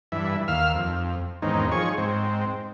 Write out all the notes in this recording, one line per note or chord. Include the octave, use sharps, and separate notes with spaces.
G2 E3 E5
D#2 F5 E6 F6
F2
E2 G#2 D#3 C4 C#4 D#4
F3 G#4 C#5 C#6
G#2 C4